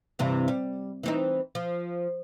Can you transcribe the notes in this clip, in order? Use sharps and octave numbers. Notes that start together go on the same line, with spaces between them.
G2 C3 E3
G3
E3 C4 D#4
F3